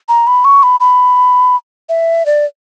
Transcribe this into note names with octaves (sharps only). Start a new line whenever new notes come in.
A#5
B5
C#6
B5
B5
E5
D5